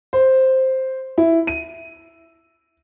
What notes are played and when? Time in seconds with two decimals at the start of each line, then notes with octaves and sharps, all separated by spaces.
0.13 C5
1.18 E4
1.47 D#7